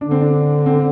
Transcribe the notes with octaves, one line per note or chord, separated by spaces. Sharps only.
D3 D4
C4
D4
C4